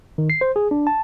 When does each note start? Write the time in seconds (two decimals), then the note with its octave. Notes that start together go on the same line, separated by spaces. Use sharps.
0.18 D#3
0.30 C7
0.41 C5
0.56 G#4
0.71 D4
0.87 A5